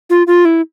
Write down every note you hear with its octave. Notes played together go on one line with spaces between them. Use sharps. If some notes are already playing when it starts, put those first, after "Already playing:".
F4
F4
E4